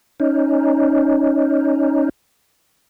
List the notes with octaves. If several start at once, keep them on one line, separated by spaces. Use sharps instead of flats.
C#4 D#4